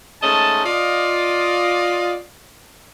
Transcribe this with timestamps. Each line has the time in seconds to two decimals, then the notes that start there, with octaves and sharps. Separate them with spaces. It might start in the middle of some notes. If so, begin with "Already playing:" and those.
0.22 G#2 A3 C#4 D#5 A5
0.64 F4 D5 D#5